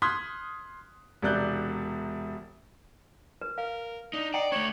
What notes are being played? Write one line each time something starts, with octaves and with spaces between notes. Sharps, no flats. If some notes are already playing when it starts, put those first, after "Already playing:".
C6 D#6 F6 F#6 G#6 B6
E1 C3 D5 F#6 G6
A#4 B4
A#4 F5
D4 D#4
D5 D#5 F#5 G5 A#5
A3 D4 C#5